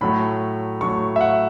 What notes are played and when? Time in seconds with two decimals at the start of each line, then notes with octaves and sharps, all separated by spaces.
0.01 A2 F#3 A3 B5
0.81 A2 F#3 A3 C#6
1.16 E5
1.21 F#5